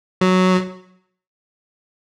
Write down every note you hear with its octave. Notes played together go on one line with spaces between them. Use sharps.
F#3